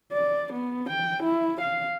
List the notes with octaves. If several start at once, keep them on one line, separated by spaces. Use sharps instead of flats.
D5
B3
G5
E4
F5